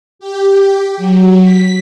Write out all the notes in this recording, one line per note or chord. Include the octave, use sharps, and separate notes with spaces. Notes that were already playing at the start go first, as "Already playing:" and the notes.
G4
F#3
B6